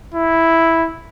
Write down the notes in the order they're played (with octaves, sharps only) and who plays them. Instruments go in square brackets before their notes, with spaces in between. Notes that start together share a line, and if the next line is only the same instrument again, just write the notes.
[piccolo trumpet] E4